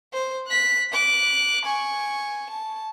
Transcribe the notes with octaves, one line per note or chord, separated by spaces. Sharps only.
C5
F#6 B6
D6 F#6
G#5 C#6
A5